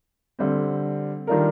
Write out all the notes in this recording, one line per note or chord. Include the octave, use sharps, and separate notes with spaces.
D3 G3 C4
D#3 G3 D4 F4 A#4